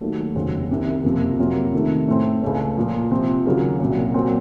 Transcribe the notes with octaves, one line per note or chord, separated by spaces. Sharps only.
D#2 D#3 F#3 A3
F1 D#2 C#3 F#3 C4
C2 C3 D#3
F#1 F2 C3 F3 A#3
F2 C3 F#3 A#3 F4
C3 D#3 A3
A2 A3 C4
C#2 C#3 A3 C#4
A#2 F3 A#3
C3 F3 C4
D#2 C#3 F#3 A#3
C2 A#2 F#3
A#2 F#3 C4